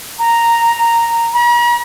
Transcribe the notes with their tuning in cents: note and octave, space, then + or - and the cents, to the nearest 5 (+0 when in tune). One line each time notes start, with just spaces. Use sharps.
A#5 -5
A#5 +45